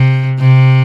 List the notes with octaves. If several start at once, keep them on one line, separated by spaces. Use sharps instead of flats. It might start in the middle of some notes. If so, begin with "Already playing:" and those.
Already playing: C3
C3